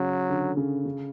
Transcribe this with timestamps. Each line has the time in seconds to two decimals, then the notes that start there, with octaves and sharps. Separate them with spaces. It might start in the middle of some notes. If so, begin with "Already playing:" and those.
Already playing: C#3 F#3
0.30 D3
0.57 C#3
0.85 C#3